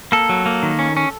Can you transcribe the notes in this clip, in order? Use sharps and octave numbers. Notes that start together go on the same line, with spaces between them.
A#3 A4
F#3
A#3
D#3
C#4
C#4